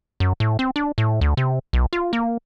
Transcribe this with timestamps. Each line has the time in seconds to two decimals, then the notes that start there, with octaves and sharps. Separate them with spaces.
0.20 F#2
0.40 A2
0.59 C4
0.76 D4
0.98 A2
1.21 D2
1.37 C3
1.73 B1
1.93 F4
2.13 A#3